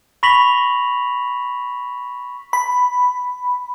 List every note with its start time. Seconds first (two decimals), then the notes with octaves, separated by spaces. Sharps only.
0.23 B5 C#6 A#6 B6 F7 F#7
2.53 B5